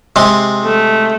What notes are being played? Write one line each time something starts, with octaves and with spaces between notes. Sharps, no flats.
C3 G#3 C6
A3